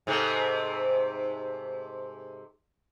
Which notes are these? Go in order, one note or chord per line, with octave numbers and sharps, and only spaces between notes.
G#2 C3 A3